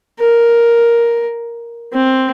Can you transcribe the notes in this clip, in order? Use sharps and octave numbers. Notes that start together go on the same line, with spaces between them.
A#4
C4